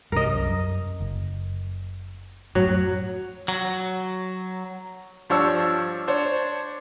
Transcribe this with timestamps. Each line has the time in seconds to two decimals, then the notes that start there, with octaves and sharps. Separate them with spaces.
0.12 C2 G2 A#4 D#5
0.36 F#2
1.00 F#1
2.55 F#2 A2 F#3
3.48 F#3
5.30 G2 F3 D4 C#5 C#6 E6
6.08 D4 C5 C#5